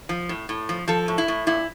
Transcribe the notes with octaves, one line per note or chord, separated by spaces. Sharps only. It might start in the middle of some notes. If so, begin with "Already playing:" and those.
F3
A2
A2
F3
F3 A4
A2
E4
A2
A#2 E4